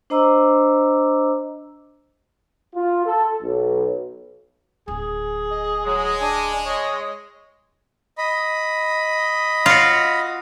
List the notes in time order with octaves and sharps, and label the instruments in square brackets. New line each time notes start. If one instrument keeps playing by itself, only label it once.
[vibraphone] D4 C5 D#5 A#5 D6 E6
[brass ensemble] F4
A4
B1
[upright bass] D1 [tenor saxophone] G#4
[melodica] D#5
[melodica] F#3 [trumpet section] G#3
[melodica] D4 G#5
C#5 D#5
[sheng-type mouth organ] D#5 B5
[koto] F4 F#4